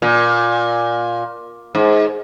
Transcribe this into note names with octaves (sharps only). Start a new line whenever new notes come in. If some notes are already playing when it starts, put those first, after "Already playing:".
A#2
G#2